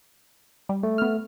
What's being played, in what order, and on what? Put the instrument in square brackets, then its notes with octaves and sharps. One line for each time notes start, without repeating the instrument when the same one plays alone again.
[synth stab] G3
[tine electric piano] A3
[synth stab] B3 F6